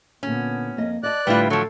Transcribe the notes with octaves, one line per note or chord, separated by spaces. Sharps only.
A#2 D3 B3 C#4
F2 A#3 D#5
D5 D#5 A5 F#6
A2 D3 G3 E4 F4 B4
F3 F#3 A4 C#5